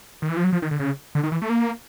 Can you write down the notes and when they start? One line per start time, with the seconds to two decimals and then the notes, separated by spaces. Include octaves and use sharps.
0.22 D#3
0.29 E3
0.37 F3
0.44 F#3
0.53 F3
0.62 D#3
0.71 D3
0.80 C#3
1.15 D3
1.23 D#3
1.32 E3
1.42 A3
1.50 A#3